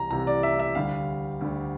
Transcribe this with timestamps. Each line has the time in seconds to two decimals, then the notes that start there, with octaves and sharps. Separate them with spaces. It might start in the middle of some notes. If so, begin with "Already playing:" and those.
Already playing: C2 C3 E3 A#5
0.11 C2 C3 E3 A#5
0.27 D5
0.43 E5
0.60 E5
0.75 D2 D3 G3 F5
1.41 D2 D3 G3